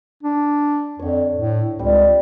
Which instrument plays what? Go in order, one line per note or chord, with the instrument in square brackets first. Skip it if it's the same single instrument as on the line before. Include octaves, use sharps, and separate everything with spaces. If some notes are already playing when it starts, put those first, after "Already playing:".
[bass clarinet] D4
[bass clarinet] F2 [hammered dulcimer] D3 C#5
[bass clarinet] A2
[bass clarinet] C#2 [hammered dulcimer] G3 C4